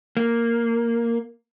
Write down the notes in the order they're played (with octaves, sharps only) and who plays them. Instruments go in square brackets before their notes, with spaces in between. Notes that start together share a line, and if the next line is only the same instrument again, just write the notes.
[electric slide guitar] A#3